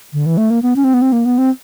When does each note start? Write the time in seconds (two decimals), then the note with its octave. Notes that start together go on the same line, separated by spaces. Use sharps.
0.13 D3
0.26 E3
0.37 A3
0.50 A#3
0.63 B3
0.76 C#4
0.84 C4
0.94 B3
1.02 C4
1.12 A#3
1.25 B3
1.38 C4